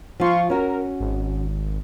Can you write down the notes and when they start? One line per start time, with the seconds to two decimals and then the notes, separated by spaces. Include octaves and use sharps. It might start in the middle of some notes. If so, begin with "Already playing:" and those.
0.20 F3 F4 F5 C6 C#6
0.50 C#4 F#4 A#4
1.00 G#1